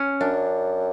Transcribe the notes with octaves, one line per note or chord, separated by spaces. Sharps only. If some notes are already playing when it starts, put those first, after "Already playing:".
Already playing: C#4
F#2 D4